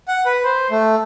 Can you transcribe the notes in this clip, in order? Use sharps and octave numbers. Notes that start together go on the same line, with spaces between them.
F#5
B4
C5
A3